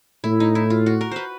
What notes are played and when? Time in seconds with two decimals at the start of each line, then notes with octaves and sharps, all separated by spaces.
0.24 A2 E4
0.40 D#4
0.55 E4
0.70 F4
0.86 F#4
1.01 A#4
1.11 B4 C5